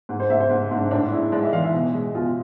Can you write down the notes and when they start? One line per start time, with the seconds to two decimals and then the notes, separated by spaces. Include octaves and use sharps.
0.09 G#2
0.20 C5
0.30 G#2 E5
0.40 C5
0.50 G#2
0.71 G#2
0.78 D4
0.91 A2 D4
1.12 G#3 E4
1.32 G#3 D5
1.43 E5
1.53 E3 F5
1.64 E5
1.73 B2
1.94 G#3
2.15 B2 F4